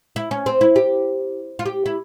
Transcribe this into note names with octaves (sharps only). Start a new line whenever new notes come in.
E4
C#4
C4
E4
G4
F4
G4
E4